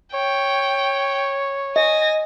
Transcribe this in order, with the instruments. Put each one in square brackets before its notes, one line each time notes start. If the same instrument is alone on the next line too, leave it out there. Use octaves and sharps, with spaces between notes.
[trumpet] C#5 [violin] G5
[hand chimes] D#5 [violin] G#5 A#6